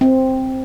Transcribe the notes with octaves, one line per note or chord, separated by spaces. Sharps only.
C4